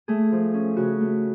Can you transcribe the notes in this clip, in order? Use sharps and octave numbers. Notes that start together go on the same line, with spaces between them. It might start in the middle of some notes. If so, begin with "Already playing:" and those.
A3 G#4
F3
C#4
C#3 F#4
A3